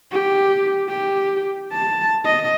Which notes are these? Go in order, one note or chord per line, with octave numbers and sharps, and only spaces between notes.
G4
G4
A5
D#5